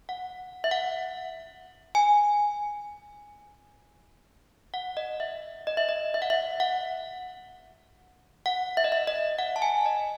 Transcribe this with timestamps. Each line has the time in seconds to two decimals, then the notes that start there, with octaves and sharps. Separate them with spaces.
0.09 F#5
0.64 E5
0.71 F#5
1.95 G#5
4.74 F#5
4.97 D#5
5.20 E5
5.67 D#5
5.77 E5
5.89 D#5
6.14 E5
6.22 F#5
6.30 E5
6.60 F#5
8.46 F#5
8.77 E5
8.84 D#5
8.92 E5
9.07 D#5
9.38 F#5
9.56 A5
9.62 G#5
9.86 D#5